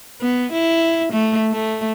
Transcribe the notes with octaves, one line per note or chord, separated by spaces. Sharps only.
B3
E4
A3
A3